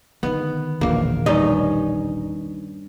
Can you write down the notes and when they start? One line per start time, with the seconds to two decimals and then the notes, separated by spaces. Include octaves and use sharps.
0.23 D3 D#3 B3
0.81 E1 A#1 E2 A#3
1.26 G2 C#4 D#4